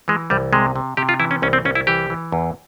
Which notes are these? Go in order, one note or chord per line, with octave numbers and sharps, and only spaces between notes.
E3 G#3
C2 G3
C3 G#3
C3
C3 G4
F4
E3 E4
C#4
C2 C#4
C4
C2 C#4
E4
E3 G4
E3
E2